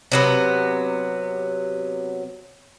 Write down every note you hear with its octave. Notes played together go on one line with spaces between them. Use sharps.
C3 F#3 B3